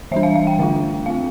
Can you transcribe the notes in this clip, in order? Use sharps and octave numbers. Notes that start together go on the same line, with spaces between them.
E3 G3 D4 E5
F5
F5
G5
D3 A3 D4 F4
A3 C4 F4 F5